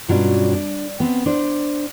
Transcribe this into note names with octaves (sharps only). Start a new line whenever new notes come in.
G2 B2 F#3 C#4 D4 F4
D4
B3 C4
D4 C5